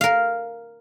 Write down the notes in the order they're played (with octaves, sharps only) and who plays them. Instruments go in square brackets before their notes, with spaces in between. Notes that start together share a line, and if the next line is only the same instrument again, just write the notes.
[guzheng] A#4 F5